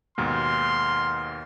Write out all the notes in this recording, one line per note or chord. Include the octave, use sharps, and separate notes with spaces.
D#2 G#2 B2 C6 F6